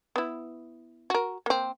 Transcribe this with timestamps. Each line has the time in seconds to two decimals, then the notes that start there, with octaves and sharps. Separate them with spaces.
0.16 B3 E4
1.10 F#4 A#4
1.46 A#3 C4